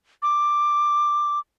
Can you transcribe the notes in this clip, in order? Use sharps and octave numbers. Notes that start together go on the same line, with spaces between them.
D6